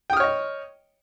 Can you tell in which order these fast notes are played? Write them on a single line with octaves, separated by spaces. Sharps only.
G5 D#6 F6 C#5 D#5